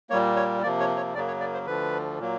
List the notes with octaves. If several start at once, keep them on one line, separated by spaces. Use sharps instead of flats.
A#2 G3 A#3 C#5
C#5
C3 F3 A#3 D5
C#5
C#5
F#2 C#3 F#3 A#3 D5
C#5
D5
C5
D2 D3 F3 B4
A#2 F#3 A#3